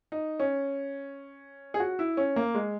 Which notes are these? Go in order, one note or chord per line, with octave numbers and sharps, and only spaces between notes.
D#4
C#4
G#4
F#4
E4
C#4
A#3
G#3